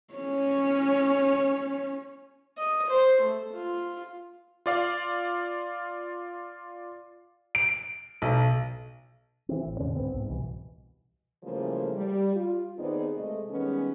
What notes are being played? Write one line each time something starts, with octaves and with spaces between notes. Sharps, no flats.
C#4 C#5
D#5
C5
A3
F4
F4 D5 F5
D7
B1
E3 C4
A1
E2 A2 D3 C#4
C2 G#2 B3 C4
C2 G#2
C2 B2 E3
C#3 E3 F3 G3 A3 A#3
G3
F4
D#2 B3 C4 D#4 G#4 D5
C3 G#3 A3 D#5
D#3 G3 G#3 B3 C#4